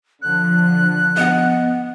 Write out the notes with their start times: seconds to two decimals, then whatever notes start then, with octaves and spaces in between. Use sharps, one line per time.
0.22 D3 F3 F#6
1.17 B3 D#5 F#5